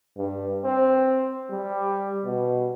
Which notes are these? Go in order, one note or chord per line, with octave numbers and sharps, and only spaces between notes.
G2
C4
G3
B2